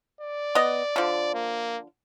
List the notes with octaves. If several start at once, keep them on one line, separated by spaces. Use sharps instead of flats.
D5
B3 D#5
D3 F3
A#3